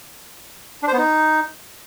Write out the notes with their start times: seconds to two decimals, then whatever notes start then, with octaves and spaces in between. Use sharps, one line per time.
0.83 D4
0.88 C5
0.93 B3
0.98 D#4